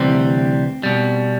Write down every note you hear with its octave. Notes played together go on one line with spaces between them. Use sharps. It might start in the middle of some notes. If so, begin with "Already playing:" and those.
Already playing: D2 C3 E3 G3 C4
B2 G3